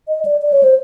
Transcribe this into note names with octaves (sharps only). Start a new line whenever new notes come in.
D#5
D5
D5
C#5
C5